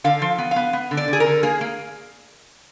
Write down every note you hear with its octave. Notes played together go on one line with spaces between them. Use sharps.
D3 F5
F3
B3
B3 F5
B3
D3
D5
D3
G#4
A#4
D3
A#3 G#4
A#3